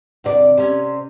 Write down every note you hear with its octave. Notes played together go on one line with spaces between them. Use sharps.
E2 C3 D5
C3 C#4